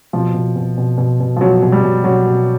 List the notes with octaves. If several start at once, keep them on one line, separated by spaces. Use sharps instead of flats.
B2 F3
B2
B2
B2
B2
B2
F3
B2 F#3
B2
G3
B2
B2 F#3
B2